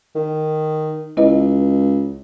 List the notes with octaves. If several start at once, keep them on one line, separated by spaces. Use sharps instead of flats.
D#3
C#2 E4 B4 D#5